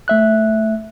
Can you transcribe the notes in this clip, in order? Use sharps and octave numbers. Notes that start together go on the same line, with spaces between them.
A3 E5 F#6